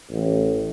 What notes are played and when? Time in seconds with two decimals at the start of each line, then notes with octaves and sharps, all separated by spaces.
0.11 A1